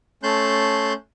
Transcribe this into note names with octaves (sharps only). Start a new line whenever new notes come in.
A3 C#4 A5 C6 F#6 G6